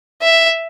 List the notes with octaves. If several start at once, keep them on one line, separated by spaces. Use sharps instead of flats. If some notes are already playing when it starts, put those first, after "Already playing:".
E5